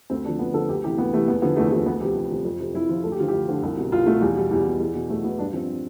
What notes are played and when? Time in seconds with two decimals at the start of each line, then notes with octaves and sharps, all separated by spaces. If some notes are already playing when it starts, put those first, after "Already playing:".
0.10 D2 C4
0.25 D3 F3 D4
0.39 D2 B3
0.54 D3 F3 A4
0.69 D2 G4
0.84 C3 E3 G4
0.98 D2 B3
1.13 E3 A3
1.17 C3
1.28 E2 B3
1.42 D3 F3 B3
1.56 E2 A3
1.72 D3 F3 A3
1.86 D2 B3
2.01 C3 F3 G4
2.16 D2
2.30 C3 F3
2.45 F2
2.59 C3 F3
2.74 F2 E4
2.89 C3 F3 F4
3.04 D2 A4
3.12 G4
3.18 D3 F4
3.23 F3
3.28 G4
3.33 D2
3.48 D3 F3
3.63 C2
3.77 B2
3.92 C2 F4
4.06 B2 A3
4.21 E2 G3
4.36 B2 G3
4.51 E2 G3
4.66 B2
4.80 E2
4.95 B2
5.09 E2 A3
5.24 B2 B3
5.39 G2 D4
5.53 F3 C4